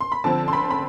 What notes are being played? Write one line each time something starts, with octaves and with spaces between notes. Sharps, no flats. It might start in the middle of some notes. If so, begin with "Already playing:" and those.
C6
B5
D3 F3 C4 A5
C6
B5
B5